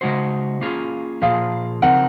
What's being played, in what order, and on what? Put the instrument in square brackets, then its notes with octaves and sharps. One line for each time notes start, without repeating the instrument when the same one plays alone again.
[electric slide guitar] C#3 G#3 D#4 F#4 C5
A#3 C#4 F4 G#4
[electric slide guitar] A#2 F3 A#3 F4 G#4 [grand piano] F5
[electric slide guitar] C#3 F3 C4 D#4 A#4 [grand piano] F#5